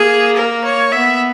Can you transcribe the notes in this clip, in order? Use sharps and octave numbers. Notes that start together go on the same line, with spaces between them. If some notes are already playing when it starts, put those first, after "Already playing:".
Already playing: A#3 G#4
A#4
C#5
B3 E5